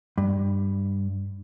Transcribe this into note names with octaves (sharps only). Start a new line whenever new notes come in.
G2